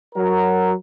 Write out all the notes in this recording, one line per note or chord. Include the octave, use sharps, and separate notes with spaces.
F#3 A#4